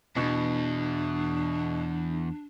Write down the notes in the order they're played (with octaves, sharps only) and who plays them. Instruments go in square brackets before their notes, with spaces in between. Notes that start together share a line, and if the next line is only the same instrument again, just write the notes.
[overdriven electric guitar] E2 [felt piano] B2 [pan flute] D4